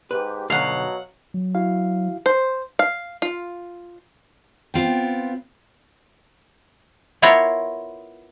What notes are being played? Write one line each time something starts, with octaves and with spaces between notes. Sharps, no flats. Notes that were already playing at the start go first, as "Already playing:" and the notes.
G#2 G4 B4
B1 G2 B2 D3 F#3 F#4 F5 F#5
F#3
E4 F#4 F5
C5
F5
F4
B3 C4 F4 G5
B3 E4 F4 A#4 C#5